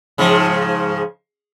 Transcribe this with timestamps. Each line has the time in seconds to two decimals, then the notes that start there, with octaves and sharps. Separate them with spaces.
0.18 G#2 C#3 F3